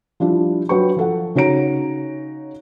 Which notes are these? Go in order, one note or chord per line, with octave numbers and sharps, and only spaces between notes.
F3 G3 D4 E4 F4
F#3 D4 B4 G5 C#6
F3 A4 F#5
C#3 D#4 F#4 C#5 A#5 D7